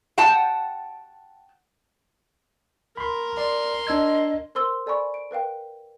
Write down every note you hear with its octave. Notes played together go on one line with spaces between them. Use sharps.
F#5 G5 A5
A#4 B5 C6
D5 C6
D4 D#5 E6 G#6
A#4 C5 C6 E6 G7
A4 D5 G#5 B5 C#6
D7
A#4 B4 F5 G5